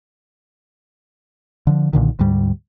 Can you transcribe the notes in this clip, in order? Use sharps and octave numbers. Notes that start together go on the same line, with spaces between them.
D3 F3
B1 A#2 D3 D#3
D2 G#2 G3